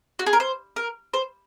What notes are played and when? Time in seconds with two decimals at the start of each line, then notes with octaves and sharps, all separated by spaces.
0.19 F#4
0.26 G#4
0.33 A#4
0.40 C5
0.76 A#4
1.14 C5